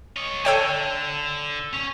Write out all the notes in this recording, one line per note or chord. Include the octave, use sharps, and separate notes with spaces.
C#5 D#5
D3 A4 C#5 G5
C#4